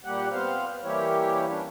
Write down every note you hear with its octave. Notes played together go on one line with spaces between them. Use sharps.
A#2 G3 A#3 G4 F#5
B3 C4 C5 F5
E3 G3 A#3 E4 G4 C#5
C#4 D4